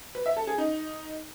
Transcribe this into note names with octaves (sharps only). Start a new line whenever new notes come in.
B4
E5
A4
G#4
D#4